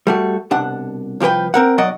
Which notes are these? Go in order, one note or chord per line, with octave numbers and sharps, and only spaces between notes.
G3 A3 F#4
C2 B2 D4 F#5
C2 F3 G4 B4 G5
C4 A#4 F#5
B1 F#3 D5 D#5 F#5